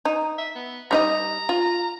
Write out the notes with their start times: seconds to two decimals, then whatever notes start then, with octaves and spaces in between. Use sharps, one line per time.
0.05 D#4
0.38 E5
0.55 B3
0.91 G3 D#4 D#5 A#5
1.49 F4